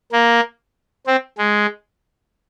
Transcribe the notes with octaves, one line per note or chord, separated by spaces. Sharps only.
A#3
C4
G#3